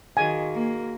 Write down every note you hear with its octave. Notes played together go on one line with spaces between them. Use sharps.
D#3 F#4 G#4 F5 G#5
A#3